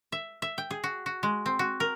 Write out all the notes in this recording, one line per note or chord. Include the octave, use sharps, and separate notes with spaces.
E5
E5
G5
G#4
F#4
F#4
G#3
C4
F#4
A#4